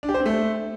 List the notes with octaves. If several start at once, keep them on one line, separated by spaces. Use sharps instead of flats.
D4
G4
C5
C4
A3